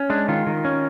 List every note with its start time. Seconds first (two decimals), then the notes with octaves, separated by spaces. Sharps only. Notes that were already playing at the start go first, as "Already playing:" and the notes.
Already playing: C#4
0.10 G#3 D4
0.28 D#3 F4
0.47 D#3
0.65 C#4